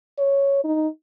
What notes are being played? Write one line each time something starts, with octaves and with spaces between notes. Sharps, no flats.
C#5
D#4